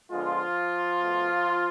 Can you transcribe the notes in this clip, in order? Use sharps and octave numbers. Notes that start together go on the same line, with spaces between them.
D3 F3 G#3 B3 F4
B2 A3